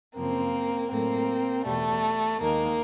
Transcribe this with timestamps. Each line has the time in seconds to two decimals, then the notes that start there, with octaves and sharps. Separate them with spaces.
0.15 F#2 C#3 F3 A#3 C4
0.90 A2 F#3 A3 A#3 C4
1.65 E2 B2 G3 A3
2.39 D#2 D#3 G#3 A#3